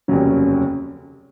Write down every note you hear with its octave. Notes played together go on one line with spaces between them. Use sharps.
F1 D#2 C#3 F#3 C#4